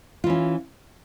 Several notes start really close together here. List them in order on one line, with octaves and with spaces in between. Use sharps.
F4 E3 C#4